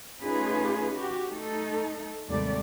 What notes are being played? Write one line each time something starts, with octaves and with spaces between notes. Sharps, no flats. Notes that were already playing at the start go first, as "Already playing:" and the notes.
A3 C#4 D#4 F4 G#4 B4
F#4 G4
A3 D#4 A4
D#2 G#2 C3 G3 A3 D5